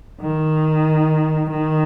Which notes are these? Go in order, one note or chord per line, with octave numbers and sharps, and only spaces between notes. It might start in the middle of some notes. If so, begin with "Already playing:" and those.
D#3
D#3